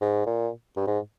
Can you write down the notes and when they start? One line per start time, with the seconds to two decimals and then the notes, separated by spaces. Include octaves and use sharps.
0.01 G#2
0.27 A#2
0.77 G2
0.87 G#2